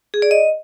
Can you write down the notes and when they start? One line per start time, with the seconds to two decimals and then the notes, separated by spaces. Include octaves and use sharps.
0.14 G#4
0.22 D5
0.31 D#5